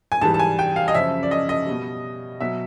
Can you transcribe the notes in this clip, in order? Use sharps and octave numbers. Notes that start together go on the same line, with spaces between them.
G#5
G#2 E3 G3 A5
A5
G#5
G5
F5
D#5
F#2 C#3 F3 E5
D5
D#5
D#5
B2 G3
B2 F#3 E5